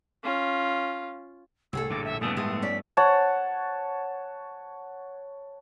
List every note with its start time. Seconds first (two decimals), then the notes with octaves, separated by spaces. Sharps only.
0.23 C#4 F4
1.73 C2 A2 G#4 A4 E6
1.90 A#1 G2 D3 D6
2.05 E5
2.21 G2 A#2 C#3 A3 B3 D#6
2.37 A2 G#3 D#6
2.62 C#4 D5 B6
2.97 C#5 F#5 A5